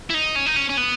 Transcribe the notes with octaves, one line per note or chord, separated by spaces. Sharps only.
E4
D#4
C#4
D#4
C#4
C#4
B3